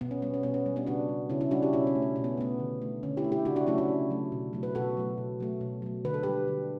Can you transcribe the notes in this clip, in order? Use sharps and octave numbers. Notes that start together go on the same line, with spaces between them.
B2 B3
C#4
G3 B3
C#4
B2 B3
C#4
G3
B3 D4
C#3 D4 F#4
G3
C#3 C#4 E4
C#4 E4
G3 D4 F#4
E4 G4
B2 C#4 E4
C#4
A3
C#4
B2 C#4
B3
A3 B3
D3
A3
D3 C#4
E4 G4
A3
E4 G4
C#3 D4 F#4
D4 F#4
F#3 A3 C#4 E4
D4 F#4
C#3
F#3 A3
B2
F#3 A3
B4
B2 F#4 A4
F#3 A3
B2
F#3 A3
B2
F#3 A3
D3 B4
A4
G3 G4 B4
D3